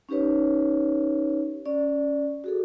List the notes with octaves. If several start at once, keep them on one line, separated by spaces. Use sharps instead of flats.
C#4 D#4 G4 B4 C#5
C#4 D5
F#4 G#4 A4